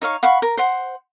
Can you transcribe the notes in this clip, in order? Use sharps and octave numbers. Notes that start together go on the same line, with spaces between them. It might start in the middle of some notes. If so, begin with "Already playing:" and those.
D#4 C#5 F5 C#6
F5 F#5 B5 C#6
A#4
C5 F#5